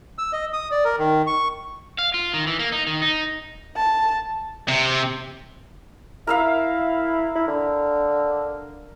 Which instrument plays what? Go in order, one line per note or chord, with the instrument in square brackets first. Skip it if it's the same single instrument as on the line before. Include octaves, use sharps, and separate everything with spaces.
[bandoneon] E6
D#5
D#6
D5
A#4
D#3
C#6
[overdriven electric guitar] F5
F4
D#3
E3
A#3
D#4
D#3
D#4
[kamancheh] A5
[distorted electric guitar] C3
[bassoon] E4 [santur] A#4 E5 F5
[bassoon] E4
D3